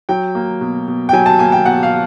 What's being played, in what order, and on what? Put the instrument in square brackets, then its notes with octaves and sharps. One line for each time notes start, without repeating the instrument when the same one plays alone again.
[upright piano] F#3 G5
A#3
B2
B2
G5
F#3 G#5
A5
A#3 G#5
G5
B2 F#5
F5